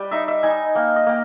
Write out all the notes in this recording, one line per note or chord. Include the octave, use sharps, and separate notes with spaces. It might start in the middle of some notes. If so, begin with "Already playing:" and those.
Already playing: G3 B4 G5
D#4 E5
E5
D#4 G#5
A#3 G5
D#5
A#3 G5